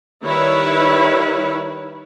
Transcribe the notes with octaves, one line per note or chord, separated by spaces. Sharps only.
D#3 G3 E4 B4 C#5